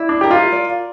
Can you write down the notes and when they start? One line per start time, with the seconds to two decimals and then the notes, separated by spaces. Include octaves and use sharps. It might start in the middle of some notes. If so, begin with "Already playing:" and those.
Already playing: E4 D5
0.09 D4
0.21 G4 A#4
0.31 F4
0.52 D5